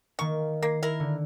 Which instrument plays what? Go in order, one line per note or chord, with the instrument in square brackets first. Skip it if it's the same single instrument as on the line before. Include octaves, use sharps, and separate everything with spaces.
[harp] D#3 A#3 [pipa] C#6
[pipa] A#3 [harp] G#6 A#6 C7
[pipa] E4 A#4
[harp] D3